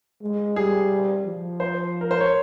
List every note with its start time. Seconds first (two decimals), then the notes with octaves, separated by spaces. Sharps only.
0.22 G#3
0.56 G3 G#4
1.26 F3
1.60 C5
2.01 A#4
2.11 C5
2.20 C#5